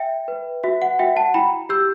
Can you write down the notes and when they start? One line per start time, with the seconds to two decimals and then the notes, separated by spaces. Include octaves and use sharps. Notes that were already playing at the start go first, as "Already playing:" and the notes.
Already playing: E5 G5
0.28 B4
0.63 F#4 E5
0.82 F#5
0.99 F#4 E5 G5
1.16 F#5 A5
1.34 E4 G5 B5
1.69 G4 E6 G6